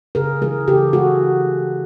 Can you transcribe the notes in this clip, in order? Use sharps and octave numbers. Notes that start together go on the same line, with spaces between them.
C#3 G#4 A#4
E3 G#3 G#4 A#4
C#3 G4 A4
E3 G#3 F#4 G#4